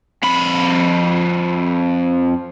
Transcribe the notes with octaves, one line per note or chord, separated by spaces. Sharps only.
F2 B5